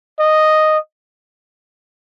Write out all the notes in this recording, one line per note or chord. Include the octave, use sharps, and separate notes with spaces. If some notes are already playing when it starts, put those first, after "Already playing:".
D#5